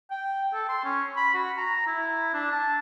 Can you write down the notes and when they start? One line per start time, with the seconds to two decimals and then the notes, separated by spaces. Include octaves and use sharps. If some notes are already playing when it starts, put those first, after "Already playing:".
0.11 G5
0.54 A4
0.69 C6
0.84 C#4
1.16 B5
1.34 F#4
1.58 A#5
1.87 E4
2.34 D4
2.51 A5